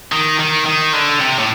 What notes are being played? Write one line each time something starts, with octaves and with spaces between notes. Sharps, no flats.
D#3
D#3
D#3
D3
C3
A2